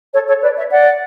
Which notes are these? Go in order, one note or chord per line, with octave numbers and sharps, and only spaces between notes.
A4 C#5
A4 C#5
B4 D5
C#5 E5
D5 F#5